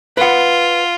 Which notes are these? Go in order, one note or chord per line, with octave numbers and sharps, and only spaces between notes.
F4 B4 F#5